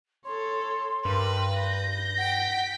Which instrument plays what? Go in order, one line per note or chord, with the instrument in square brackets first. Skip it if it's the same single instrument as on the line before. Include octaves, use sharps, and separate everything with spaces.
[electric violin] A4 C#5 [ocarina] C6
[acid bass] G2 [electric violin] A#4 [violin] B4
[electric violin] G6 A#6
[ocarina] F#5 [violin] G5 B6